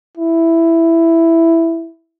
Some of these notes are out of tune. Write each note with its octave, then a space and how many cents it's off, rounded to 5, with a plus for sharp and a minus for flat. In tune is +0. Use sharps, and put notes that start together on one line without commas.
E4 +5